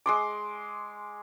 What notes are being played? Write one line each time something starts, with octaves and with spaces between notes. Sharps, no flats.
G#3 C6 D6